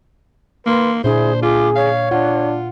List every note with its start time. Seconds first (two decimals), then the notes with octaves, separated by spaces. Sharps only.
0.67 A#3 B4 C6
1.04 A#2 D4 E4 G#4 C5
1.42 F4 G#4 D6
1.76 C#5 F5
2.11 D4 F4 F#5